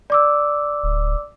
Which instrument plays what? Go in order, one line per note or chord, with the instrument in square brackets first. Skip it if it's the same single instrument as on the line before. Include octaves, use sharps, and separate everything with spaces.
[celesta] D5 D6 E6
[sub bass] D1